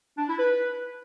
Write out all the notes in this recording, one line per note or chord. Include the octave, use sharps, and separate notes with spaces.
D4
E4
B4